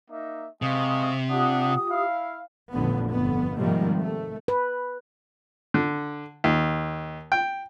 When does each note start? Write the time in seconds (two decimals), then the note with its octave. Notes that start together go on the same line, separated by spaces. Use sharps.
0.11 A#3 D#4 E5
0.62 C3 G#3 F5 C#6 D#6
1.30 D4 F4 G4 F#5 D#6
1.90 E4 F5
2.73 A1 F2 A#2 D3 B3
3.11 G1 F2 B3
3.57 G#2 C3 D#3 F3 G3 A#3
3.99 A3
4.48 B4
5.74 D3
6.44 D#2
7.32 G5